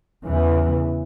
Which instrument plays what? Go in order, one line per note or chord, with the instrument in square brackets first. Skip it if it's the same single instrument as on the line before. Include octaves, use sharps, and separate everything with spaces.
[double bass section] E2 C#3 E3